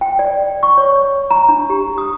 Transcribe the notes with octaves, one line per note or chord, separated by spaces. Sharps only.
G5
D5
C#6
C#5
A#5
D4
G4
D#6